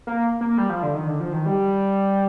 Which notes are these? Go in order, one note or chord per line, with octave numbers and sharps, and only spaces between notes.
A#3
A#3
G3
F3
D3
D#3
D3
F3
D#3
G3